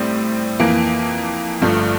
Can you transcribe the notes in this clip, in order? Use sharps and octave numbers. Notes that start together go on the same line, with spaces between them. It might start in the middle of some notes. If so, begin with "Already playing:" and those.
Already playing: A2 G3 C4
F2 E3 A#3
G1 G2 F3 A3